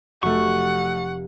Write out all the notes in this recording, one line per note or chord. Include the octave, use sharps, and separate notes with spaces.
F1 F#3 A3 F#5 C#6